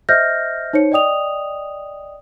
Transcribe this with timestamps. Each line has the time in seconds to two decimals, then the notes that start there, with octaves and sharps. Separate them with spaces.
0.09 C5 D#5 E5 F6 G6 A#6
0.73 D#4 C5 C#5 C#7
0.92 D5 D#5 G5 D#6 F7